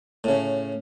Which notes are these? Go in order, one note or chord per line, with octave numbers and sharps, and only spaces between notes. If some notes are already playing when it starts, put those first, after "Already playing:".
A2 C#3